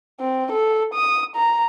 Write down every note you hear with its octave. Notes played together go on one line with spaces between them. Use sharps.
C4
A4
D#6
A#5